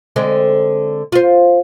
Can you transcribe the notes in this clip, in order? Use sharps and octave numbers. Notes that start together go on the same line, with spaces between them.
D3 G#3 C4
F4 C5